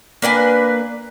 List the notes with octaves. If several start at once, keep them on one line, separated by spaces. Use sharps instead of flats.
A#3 D4 B4 G#5